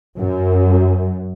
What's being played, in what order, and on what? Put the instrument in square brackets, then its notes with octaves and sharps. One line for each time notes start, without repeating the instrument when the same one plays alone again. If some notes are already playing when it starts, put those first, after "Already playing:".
[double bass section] F#2